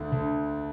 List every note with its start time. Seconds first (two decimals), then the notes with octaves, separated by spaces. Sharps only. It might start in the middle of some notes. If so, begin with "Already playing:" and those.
Already playing: D2 D3
0.12 D2 D3